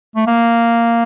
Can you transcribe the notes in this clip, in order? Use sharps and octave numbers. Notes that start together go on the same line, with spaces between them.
A3
A#3